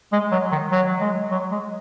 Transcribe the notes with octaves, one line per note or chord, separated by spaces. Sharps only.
G#3
F#3
D#3
F#3
G#3
F#3
G#3